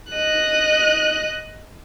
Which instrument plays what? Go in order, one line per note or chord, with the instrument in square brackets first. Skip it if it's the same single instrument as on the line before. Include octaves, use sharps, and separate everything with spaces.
[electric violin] D#5 F#6